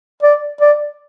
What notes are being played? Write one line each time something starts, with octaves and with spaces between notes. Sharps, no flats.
D5
D5